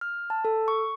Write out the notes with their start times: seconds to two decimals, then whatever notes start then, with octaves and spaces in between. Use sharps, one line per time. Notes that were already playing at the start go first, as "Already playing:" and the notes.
0.01 F6
0.30 A5
0.45 A4
0.68 C#6